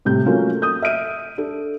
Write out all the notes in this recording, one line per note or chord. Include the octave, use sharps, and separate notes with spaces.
A2 C3 G6
F#3 A3 A#3 C#4 F4 F#4
D#6 G6
E5 F6 D7 D#7
D4 A4